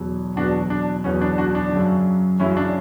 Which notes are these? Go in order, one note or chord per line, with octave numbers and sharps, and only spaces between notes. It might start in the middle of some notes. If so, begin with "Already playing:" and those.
Already playing: E2 B2 F#3
E2 B2 F#3 D4 F#4
D4
E2 B2 F#3 C#4
D4
D4 F#4
D4
F#2 C#3 F#3
F#2 C#3 F#3 C#4 E4
D4